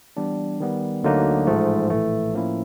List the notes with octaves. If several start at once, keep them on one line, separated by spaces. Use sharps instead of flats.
E3 G3 B3 D4
D#3 G3 B3
D2 D3 F#3 A#3 D#4
A1 G#2 F3 A3
A#1 A2 E3 A3
A2 F3 A#3 C#4 E4